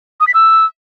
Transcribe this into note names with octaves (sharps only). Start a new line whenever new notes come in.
D#6
B6
E6